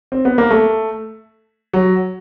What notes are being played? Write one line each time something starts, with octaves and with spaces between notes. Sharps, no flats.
C4
B3
A#3
A3
F#3